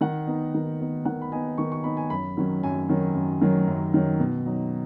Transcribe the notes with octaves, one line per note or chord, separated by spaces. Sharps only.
D#3 F#5
B3 D#4
D#3
B3 D#4
D#3 F#5
B5
B3 D#4 G#5
D#3 C#6
C#6
B3 D#4 B5
G#5
F#2 B5
D#3 F#3 C#4
F#2 G#5
D#3 F#3 C#4
F#2
D#3 F#3 C#4
F#2
D#3 F#3 C#4
B2
F#3 D#4